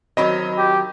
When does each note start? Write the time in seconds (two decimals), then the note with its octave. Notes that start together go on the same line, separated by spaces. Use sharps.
0.17 D#3 F#3 C4 D#5 B5
0.58 G4